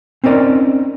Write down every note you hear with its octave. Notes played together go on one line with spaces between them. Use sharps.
C4 C#4 D#4 A#4 D5